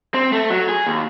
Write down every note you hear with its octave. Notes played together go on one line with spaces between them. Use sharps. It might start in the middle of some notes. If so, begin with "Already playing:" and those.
C4
A3
F#3
G#4
D#2